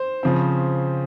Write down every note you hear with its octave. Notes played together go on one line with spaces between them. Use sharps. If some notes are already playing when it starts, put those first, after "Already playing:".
Already playing: C5
C#3 F3 C4